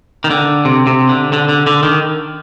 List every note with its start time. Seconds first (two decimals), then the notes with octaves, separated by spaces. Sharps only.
0.24 D#3
0.30 D3
0.65 C3
0.87 C3
1.09 D3
1.33 D3
1.49 D3
1.67 D3
1.83 D#3